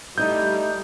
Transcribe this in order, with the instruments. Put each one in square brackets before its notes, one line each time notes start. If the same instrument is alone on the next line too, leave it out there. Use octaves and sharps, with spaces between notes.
[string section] G3 [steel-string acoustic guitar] A3 D#4 E4 [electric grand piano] G6